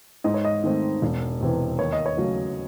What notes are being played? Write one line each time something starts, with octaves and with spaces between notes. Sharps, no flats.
G#2 D#5
C#5
D#5
D#3 A3 C4
E1
E2 C3 E3
D#2 C#5
D#5
C#5
C#3 F#3 A3 C#4